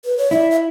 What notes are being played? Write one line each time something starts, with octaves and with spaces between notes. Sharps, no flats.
B4
C#5
E4 D5
E5